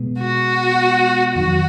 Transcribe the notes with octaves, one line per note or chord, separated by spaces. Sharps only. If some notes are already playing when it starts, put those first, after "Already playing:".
Already playing: B2 G#3 B3
F#4
F2 D#3 F#3 F#4